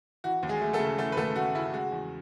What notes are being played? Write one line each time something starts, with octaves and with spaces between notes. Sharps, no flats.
E3 F#4
D#2
G#3 G#4
A3
A3 A4
C#3
E3 A3 A4
B4
D#2 A3 A4
A3 F#4
C#3 E4
G#3 F#4
E2